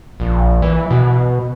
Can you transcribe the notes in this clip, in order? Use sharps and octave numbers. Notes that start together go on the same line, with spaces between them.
A#1
E3
B2